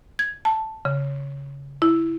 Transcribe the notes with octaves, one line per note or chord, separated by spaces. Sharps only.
G#6
A5
C#3
E4